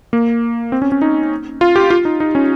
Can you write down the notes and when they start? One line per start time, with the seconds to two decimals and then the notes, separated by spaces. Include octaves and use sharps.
0.13 A#3
0.72 C4
0.82 C#4
0.92 C#4
1.02 D#4
1.61 F4
1.76 G4
1.90 F4
2.05 D#4
2.20 D#4
2.35 C#4